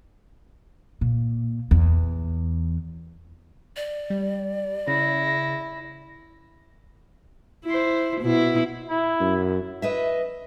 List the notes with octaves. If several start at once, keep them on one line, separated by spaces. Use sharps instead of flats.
A#2
E2
D5
G3
C#3 E4 A#6
E4 C5
B2 E4
E4
F#2
B4 D#5 E5